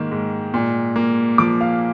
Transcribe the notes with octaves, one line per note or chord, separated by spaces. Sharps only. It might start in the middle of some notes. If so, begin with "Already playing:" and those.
Already playing: G#2 D#3 A#3
G#2
A#2
A#3
F3 D6
F5